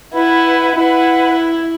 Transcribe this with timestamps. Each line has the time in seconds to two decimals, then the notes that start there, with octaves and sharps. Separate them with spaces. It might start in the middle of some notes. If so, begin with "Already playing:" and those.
0.13 E4 B4 F#5 B5
0.76 E4 B4 F#5 B5